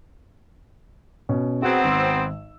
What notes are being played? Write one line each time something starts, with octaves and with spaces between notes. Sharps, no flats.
B2 C#4
F#3 B3 C4 F#4 G#4 F#5
G#1 E6